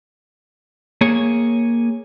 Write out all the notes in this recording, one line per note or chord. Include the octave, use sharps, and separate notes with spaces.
A#3 G#4 C#5